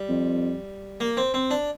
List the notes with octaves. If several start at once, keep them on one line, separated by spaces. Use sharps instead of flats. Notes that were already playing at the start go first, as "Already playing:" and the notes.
Already playing: G3
F2
A#3
C4
C4
D4